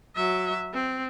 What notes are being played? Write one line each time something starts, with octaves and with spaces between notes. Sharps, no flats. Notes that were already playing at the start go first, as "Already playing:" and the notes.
F#3 E5
C4